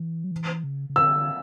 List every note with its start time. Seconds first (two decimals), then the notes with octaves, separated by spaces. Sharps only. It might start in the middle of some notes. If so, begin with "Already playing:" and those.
Already playing: E3
0.24 F#3
0.31 E3
0.64 C#3
0.90 C#3
0.96 D3 E6